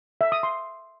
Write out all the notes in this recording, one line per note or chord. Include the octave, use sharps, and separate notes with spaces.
E5
D#6
C6